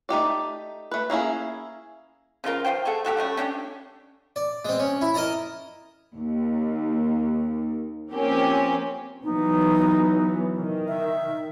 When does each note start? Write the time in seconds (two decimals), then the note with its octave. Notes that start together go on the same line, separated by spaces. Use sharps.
0.09 A3 D#4 G4 D5
0.91 A3 B4
1.10 A#3 C#4 E4 G#4
2.44 C#3 F3 F4 A#4
2.65 F3 F4 C5 G5
2.85 A3 G#4 A4 F#5
3.05 A3 F#4 G4 A4
3.17 F3 G3 A3 C#4
3.37 C#4 D4 F#4 G4
4.36 D5
4.65 G#3 C4
4.80 C#4
5.01 E4
5.14 A#4 D#5 A5 A#5
6.15 D#2
8.10 F3 A#3 C4 C#4 G4
9.24 E3 F#3 B3 D#4
10.57 D#3
10.88 E5